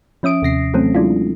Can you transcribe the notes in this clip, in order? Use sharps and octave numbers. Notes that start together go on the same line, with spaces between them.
F3 C#4 E5 D#6 D7
D#2 C3 A#6 C7
E3 F#3 A3 C4 C#4 A4
F#3 G#3 D4 E4 F4